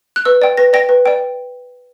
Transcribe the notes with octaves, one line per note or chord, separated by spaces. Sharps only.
F#6
B4 E6
D5 G5
B4 A#6
D5 G5 A#6
B4
D5 G5